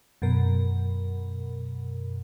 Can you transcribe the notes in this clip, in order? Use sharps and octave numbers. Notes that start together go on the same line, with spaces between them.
F#2 B2 A#4